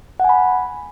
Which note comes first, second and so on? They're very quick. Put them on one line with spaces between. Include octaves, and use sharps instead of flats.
F#5 G#5 B5